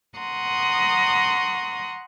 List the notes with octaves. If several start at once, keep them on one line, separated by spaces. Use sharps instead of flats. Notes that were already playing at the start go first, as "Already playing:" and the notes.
F#5 A#5 C6 C#6 D#6